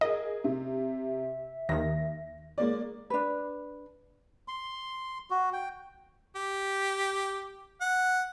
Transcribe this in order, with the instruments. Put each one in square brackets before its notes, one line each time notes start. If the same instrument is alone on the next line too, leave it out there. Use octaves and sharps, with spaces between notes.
[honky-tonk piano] G#4 A#4 [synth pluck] D#5
[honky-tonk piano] C3 [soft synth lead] E5
[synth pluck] D#2 D#3 [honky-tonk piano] A#6
[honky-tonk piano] G#3 A#3 D5
[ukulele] D4 B4
[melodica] C6
F#4
G5
[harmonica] G4
F#5